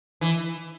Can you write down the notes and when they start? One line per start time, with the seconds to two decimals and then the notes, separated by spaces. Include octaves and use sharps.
0.21 E3